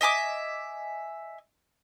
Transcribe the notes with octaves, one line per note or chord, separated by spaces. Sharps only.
D#5 E5 G#5 D6